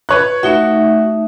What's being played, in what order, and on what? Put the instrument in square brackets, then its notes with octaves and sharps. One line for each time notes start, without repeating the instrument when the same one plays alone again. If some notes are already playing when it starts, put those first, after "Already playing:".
[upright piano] B4 C#5 F#6
[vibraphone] A3 D#4 E5 [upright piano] F#4